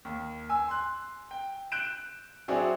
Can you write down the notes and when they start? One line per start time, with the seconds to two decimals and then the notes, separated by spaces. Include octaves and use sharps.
0.05 D#2
0.49 G#5 E6
0.68 C6 F#6
1.31 G5
1.72 F#6 G6 D7 E7
2.48 F#3 C4 D4 E4 F#4 G#4